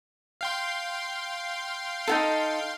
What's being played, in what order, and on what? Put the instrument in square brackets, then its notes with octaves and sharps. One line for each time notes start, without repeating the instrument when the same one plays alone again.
[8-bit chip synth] F5 G5 C6
[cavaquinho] D#4 F4 A4